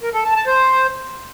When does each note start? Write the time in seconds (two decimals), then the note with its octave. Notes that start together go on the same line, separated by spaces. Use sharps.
0.03 A#4
0.14 A4
0.25 A5
0.36 A5
0.47 C5